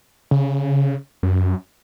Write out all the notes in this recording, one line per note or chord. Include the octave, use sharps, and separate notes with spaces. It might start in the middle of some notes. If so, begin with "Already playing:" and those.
C#3
F#2